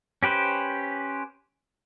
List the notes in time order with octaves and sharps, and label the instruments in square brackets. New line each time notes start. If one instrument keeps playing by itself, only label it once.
[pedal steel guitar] C#4 G4 B4 C5